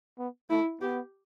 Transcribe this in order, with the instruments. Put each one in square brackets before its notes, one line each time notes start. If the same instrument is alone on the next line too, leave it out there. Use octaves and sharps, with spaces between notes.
[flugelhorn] B3
[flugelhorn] A3 [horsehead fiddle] E4
[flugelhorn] B3 [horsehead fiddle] G4